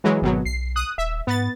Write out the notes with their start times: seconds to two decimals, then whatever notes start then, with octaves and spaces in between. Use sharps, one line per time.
0.04 E3 F#3 G#3
0.22 G#1 B2 F#3
0.45 B1 C7
0.76 D#6 F#6
0.98 D#1 E5
1.27 G#2 B3 A6